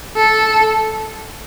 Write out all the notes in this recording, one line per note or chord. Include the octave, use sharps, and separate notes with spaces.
A4